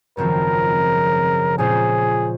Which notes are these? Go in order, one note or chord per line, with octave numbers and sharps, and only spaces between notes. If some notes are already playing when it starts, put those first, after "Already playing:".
G#1 F#2 C#3 F3 C4 A#4
A#2 G#3 C#4 F4 G#4 C5